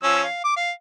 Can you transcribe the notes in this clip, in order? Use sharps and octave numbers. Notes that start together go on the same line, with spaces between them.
F3 C#4 E6
F5
D6
F5